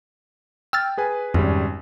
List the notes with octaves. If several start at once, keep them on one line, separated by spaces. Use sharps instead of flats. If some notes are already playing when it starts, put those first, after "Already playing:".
G5 E6 F6 A6
G#4 B4 G#5
G#1 F2 C#3 G3